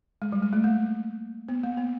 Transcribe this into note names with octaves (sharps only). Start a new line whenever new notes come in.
G#3
G3
G#3
A3
A#3
B3
A#3
B3